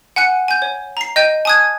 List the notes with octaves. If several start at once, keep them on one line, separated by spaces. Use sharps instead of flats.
F#5 G#5 F#6 C#7
G#5 G6
C#5
A#5 C7
D#5 G5 G6 D#7
G#5 A5 D#6 F#6 G#6